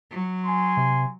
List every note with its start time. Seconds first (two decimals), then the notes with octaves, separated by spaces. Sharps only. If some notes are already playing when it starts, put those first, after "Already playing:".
0.11 F#3
0.45 G#5 C6
0.77 C3